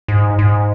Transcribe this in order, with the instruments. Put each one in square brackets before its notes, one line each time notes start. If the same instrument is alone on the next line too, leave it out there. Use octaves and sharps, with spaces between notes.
[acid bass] G#2
G#2